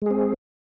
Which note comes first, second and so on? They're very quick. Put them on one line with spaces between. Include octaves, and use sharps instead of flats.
G#3 G#4 C4